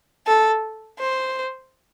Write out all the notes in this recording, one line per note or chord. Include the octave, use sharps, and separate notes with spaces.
A4
C5